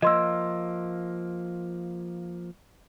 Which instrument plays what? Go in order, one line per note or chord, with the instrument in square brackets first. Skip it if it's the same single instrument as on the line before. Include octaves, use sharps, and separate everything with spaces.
[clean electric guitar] F3 A#3 [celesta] D#5 C6 E6